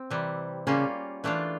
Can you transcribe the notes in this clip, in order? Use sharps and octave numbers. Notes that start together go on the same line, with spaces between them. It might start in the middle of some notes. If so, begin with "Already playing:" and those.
Already playing: C4
C3 E3 G3
C#3 G3 A#3 C#4 F4
E3 A3 D4 F4